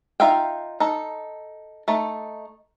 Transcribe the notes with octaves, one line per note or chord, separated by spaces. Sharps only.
D#4 F4 E5 F5 G5
D#4 A4
A3 D#4